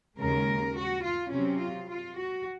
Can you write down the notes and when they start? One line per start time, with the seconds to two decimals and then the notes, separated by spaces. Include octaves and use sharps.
0.18 D#2 C#3 G#3 A#4
0.75 F#4
1.03 F4
1.31 C3 F#3 C4 C#4
1.60 F4
1.88 F4
2.16 F#4